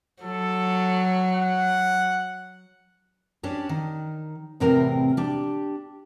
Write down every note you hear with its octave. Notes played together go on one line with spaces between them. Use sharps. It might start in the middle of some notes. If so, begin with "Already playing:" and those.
F#3 A4
F#5
C#4 D4 G4
D#3
E2 A2 C3 C4 A#4 G5
D4 G4